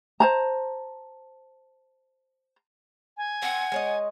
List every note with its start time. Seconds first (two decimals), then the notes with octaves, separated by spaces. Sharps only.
0.20 C5 A5 A#5
3.17 G#5
3.42 C4 F#5
3.72 G#3 C#5 D#5